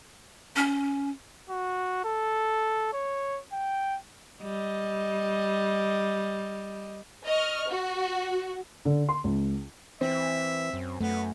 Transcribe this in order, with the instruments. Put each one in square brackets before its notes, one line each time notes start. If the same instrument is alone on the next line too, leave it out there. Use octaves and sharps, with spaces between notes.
[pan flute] C#4
[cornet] F#4
A4
C#5
G5
[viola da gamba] G3 D#5
[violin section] D#5 C#6 F6
F#4
[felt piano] D3
C6
C#2
[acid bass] E3 [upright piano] C4 [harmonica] E5
[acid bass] F#2
[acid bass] F#2 [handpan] A3 [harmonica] B3